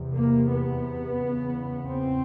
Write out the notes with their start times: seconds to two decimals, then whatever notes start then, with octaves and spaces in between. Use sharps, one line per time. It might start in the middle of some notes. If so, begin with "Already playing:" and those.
Already playing: E2 C3
0.15 A#3
0.50 B3
1.19 E2 C#3
1.87 C4